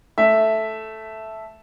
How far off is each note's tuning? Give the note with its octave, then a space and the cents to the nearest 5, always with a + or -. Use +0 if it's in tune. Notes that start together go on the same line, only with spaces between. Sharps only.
A3 -5 E5 +0